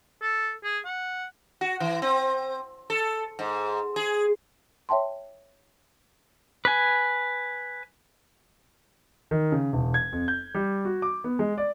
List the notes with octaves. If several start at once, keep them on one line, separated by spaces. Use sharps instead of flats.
A4
G#4
F#5
F#4
E3
C4
A4
G#2
G#4
C#5 E5 G5 A5 C6
B4 G#5
D#3
C#3
E1
G#6
F2
G6
G3
F#4
D6
B3
G#3
D5